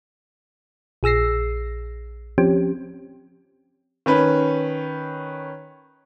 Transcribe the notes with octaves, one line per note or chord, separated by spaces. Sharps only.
A#1 G#4 E6 A#6 C7
F3 C4 C#4 G4
D#3 C#4 B4